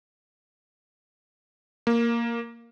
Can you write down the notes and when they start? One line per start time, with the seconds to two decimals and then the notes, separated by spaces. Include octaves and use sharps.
1.87 A#3